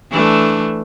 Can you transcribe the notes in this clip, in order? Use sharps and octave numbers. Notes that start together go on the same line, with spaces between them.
E3 A3 D4